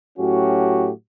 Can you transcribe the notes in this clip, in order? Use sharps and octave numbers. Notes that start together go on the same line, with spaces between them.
A2 F#3 C#4 F#4 G4